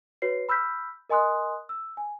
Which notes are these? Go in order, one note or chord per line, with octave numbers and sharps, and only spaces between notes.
F#4 B4 C#5 C7
B5 E6 F6 G6 B6
A#4 D#5 G#5 C6 D#6 F#6
E6
G#5